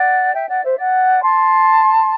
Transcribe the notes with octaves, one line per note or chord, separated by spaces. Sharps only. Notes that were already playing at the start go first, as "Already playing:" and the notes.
Already playing: D5 F#5
E5 G5
D5 F#5
C5 E5
D5 F#5
A5 C6